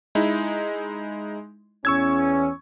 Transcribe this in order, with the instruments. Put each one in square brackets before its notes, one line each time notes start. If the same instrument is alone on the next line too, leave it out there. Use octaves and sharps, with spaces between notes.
[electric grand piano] G#3 D#4 E4
[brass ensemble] E2 C#4 [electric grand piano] C#6 E6 G#6